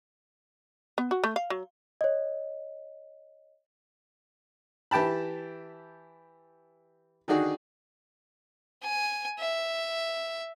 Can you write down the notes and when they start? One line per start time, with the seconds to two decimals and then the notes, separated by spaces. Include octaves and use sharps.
0.98 B3
1.11 F#4
1.24 A3
1.36 F5
1.50 F#3
2.01 C#5 D#5
4.91 E3 G4 G5 A5 B5
7.28 D3 D#3 D4 D#4 F#4 G#4
8.83 G#5
9.39 E5